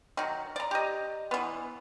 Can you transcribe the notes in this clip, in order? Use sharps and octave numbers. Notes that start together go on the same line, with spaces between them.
D#3 F#3
D5 A#5
G4 D#5
E3 B3